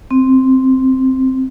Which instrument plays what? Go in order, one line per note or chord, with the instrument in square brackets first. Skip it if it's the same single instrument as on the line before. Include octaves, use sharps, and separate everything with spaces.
[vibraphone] C4